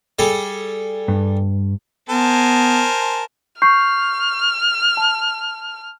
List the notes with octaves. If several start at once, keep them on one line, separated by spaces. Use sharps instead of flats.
G3 G#4 A4
G2
B3 A#4 C5 G#5 A5
C#6 F6 G6 C7
A5